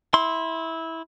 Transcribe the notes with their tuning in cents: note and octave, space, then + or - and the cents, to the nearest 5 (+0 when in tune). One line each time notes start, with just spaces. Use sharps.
E4 -15 C6 +5